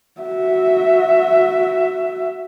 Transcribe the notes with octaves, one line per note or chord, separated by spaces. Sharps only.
F#4 E5